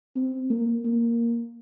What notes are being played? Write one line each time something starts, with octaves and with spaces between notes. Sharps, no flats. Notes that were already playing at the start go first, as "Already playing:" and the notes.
C4
A#3
A#3